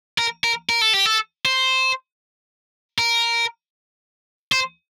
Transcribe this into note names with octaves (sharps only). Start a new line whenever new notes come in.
A#4
A#4
A#4
A4
G4
A4
C5
A#4
C5